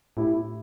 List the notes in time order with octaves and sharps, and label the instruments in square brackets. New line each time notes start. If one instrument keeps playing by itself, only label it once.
[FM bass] A2 [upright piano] E4 G4